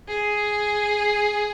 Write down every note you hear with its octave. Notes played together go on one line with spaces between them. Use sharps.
G#4